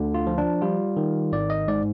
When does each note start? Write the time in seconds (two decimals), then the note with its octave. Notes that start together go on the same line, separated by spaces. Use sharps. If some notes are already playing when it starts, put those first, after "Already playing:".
Already playing: D2 D3
0.14 F4
0.27 F3
0.38 D4
0.62 G3 F4
0.97 D#3
1.32 G#1 D5
1.50 D#5
1.68 G#2 D5